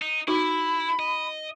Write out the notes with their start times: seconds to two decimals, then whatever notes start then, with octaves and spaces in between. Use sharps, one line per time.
0.02 D#4
0.28 D#4 E4 F#4 B5
0.99 D#5